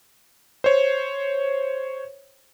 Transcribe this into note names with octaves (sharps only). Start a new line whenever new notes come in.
C5 C#5